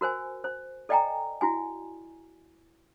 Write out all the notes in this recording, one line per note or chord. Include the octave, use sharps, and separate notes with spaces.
F#4 A#4 C5 G#5
C5
A4 D5 D#5 G5 G#5 A#5
E4 F#4 G#5